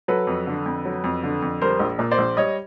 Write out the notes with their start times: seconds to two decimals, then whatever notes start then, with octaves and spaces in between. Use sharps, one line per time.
0.08 F#3 A4 B4
0.27 F2
0.47 D3
0.66 F2
0.85 F#3
1.04 F2
1.23 D3
1.42 F2
1.62 G3 A#4 C5
1.79 A#1
1.99 A#2
2.11 C5 D5
2.18 A#1
2.37 G3 C#5 D#5